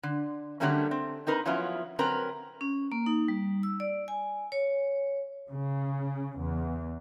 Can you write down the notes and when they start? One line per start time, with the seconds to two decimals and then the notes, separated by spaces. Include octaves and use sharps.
0.03 D3
0.60 D3 F#3 G3 A3 A#3 C#4
0.91 C4
1.27 C4 D#4 A#4 B4
1.45 F3 F#3 B3 C#4 E4 F4
1.99 F#3 C4 C#4 A#4 B4 A#5
2.61 C#4
2.92 A#3
3.06 D#4
3.28 G3
3.63 E6
3.80 D5
4.08 G#5
4.52 C#5
5.50 C#3
6.39 E2